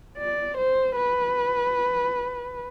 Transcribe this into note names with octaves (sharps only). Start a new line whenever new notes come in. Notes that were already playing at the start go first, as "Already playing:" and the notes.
D5
C5
B4